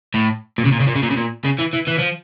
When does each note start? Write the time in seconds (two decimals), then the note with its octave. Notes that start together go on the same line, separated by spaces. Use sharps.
0.14 A2
0.58 A#2
0.65 C#3
0.72 A#2
0.80 C#3
0.87 A#2
0.95 C#3
1.03 A#2
1.10 C#3
1.17 A#2
1.45 C#3
1.59 E3
1.74 E3
1.88 E3
1.99 F3